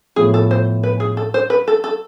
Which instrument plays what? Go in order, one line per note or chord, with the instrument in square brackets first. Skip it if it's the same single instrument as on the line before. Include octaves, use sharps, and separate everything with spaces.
[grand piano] A2 F3 B3 F4 [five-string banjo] G#4
[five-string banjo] A4
C5
B4
G#4
A4
C5
B4
A4
A4